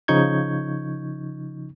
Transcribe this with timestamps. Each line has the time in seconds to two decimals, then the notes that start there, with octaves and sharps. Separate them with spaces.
0.08 C#3 F3 D#4 C#6 G6 G#6